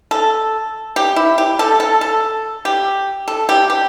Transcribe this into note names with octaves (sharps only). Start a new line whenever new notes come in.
A4
G4
E4
G4
A4
A4
A4
G4
A4
G4
G4